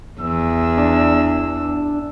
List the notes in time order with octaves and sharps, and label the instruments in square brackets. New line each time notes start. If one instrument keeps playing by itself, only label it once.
[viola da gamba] E2 [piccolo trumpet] E6
[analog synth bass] D4